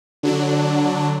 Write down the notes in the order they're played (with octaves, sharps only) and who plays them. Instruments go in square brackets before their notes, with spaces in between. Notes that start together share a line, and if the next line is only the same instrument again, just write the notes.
[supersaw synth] D3 F#3 D4